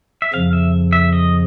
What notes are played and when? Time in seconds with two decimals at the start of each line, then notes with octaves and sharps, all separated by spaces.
0.22 E5
0.33 F2 C#3 F3 F5
0.53 E5
0.93 E5
1.13 D#5